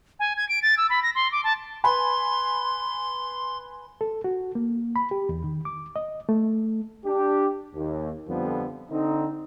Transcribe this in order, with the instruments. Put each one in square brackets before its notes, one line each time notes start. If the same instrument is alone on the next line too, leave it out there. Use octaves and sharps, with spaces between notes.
[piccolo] G#5
G#6
D7
A6
E6
B5
A#6
C6
D6
A5
[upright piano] B4 G#5 B5 [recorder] C6
[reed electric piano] A4
F#4
A#3
B5
G4
E2
D#3
D6
D#5
A3
[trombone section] D4 G4
D#2
F2 D3 F3 G3 B3
D3 C4 D#4